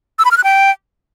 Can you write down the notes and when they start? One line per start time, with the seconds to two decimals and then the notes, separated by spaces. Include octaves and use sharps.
0.19 E6
0.25 B5
0.31 F6
0.38 F#6
0.44 G5